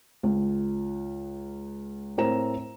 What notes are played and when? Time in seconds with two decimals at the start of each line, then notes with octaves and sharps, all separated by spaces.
0.23 C#2
2.18 A2 C4 A#4 A#5 E7